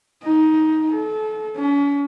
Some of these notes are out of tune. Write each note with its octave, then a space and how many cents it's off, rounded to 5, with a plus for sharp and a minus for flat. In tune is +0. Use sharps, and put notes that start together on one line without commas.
D#4 +15
A4 -30
C#4 +40